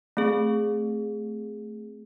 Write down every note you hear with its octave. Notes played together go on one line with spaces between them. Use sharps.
A3 C4 G#4